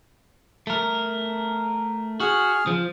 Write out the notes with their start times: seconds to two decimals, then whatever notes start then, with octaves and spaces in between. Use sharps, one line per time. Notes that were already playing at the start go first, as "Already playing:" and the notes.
0.67 A3 A#4
2.20 F#4 G#4 F6
2.67 F3